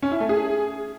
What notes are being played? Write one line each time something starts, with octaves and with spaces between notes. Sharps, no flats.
C#4
E4
A3
G#4